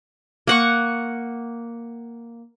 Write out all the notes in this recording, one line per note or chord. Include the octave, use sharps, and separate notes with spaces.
A#3 F#5 C#6